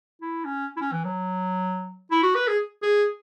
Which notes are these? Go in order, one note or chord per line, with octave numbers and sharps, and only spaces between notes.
E4
C#4
E4
C#4
E3
F#3
E4
F#4
B4
G#4
G#4